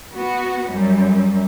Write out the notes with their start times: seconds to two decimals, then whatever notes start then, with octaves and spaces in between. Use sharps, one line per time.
0.11 B3 F#4
0.69 F#2 G3